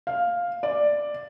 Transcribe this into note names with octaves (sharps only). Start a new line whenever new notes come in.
F5
D5